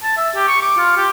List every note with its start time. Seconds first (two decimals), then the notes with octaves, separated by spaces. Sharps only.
0.03 A5
0.17 E5
0.35 G4
0.48 C#6
0.62 D6
0.77 F4
0.97 G4